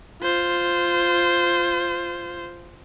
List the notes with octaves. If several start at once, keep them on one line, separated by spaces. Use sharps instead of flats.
F4 C5